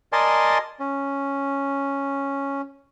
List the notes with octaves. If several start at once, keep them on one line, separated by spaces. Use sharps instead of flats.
A#4 D5 D#5 G#5 A5 C6
C#4